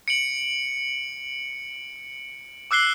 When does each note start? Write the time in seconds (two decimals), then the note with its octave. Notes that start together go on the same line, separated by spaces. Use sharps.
0.08 C#7 D7 F#7
2.71 D6 E6 F#6 C7 G7